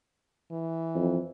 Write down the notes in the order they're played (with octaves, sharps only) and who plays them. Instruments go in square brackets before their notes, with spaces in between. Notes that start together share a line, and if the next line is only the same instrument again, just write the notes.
[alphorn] E3
[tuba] F2